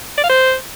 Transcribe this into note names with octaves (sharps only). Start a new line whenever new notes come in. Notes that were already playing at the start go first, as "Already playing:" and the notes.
D5
F5
C5